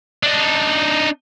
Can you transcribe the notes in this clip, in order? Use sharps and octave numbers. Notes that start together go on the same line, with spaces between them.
D4 D#4